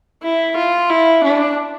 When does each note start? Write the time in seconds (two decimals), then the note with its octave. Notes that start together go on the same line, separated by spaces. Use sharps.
0.22 E4
0.56 F4
0.89 E4
1.24 D4